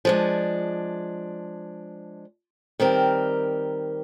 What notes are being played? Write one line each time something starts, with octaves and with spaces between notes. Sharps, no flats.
F3 G#3 D4
D#3 G3 C4 G4 A#4